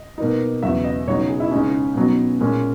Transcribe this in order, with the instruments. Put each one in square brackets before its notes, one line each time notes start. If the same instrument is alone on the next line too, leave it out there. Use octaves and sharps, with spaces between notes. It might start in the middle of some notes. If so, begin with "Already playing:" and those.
Already playing: [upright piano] D#5
B2 A#3 D#4
E2 C#3 F#3 B3 E5
D#5
C#2 B2 F#3 B3 D#4 C#5
G#4
E4
C#2 C#3 G#3 C#4 D#4
B2 F#3 B3 D#4
A#2 G#3 C#4